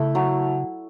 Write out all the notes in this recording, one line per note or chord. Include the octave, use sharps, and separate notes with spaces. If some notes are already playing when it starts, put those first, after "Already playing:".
Already playing: C#3 A3 E4
F#3